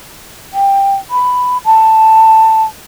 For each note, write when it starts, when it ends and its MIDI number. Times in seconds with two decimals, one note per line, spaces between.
0.53 0.95 79
1.10 1.58 83
1.65 2.63 81